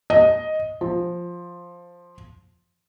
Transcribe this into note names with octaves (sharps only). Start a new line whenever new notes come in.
D#5
F3